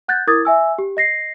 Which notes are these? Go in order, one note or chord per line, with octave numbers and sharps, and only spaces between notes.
F#5 F#6 G6 A6
E4 A#4 D6 D#6 G#6 A6
E5 G#5 E6
G4
D#5 A#6 C7